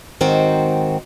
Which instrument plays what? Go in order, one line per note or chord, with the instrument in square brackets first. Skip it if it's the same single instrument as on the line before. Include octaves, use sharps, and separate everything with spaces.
[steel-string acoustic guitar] G#2 D#3 C4 F#4